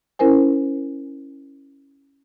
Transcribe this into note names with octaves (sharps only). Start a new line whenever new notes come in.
C#4 E4 A#4 C5 G#5